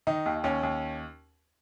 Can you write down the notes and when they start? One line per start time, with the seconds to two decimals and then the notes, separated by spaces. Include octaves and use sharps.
0.07 D#3 D#4
0.26 D#2
0.44 D#2 C#4
0.63 D#2